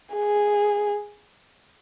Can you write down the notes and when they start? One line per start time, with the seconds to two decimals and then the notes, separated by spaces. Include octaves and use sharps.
0.15 G#4